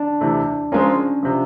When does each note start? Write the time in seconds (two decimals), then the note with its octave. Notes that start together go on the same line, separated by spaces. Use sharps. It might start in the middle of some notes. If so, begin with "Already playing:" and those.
Already playing: D4
0.21 C3 E3 A3
0.72 F3 G#3 C4 C#4 F4 A#4
1.23 C3 F3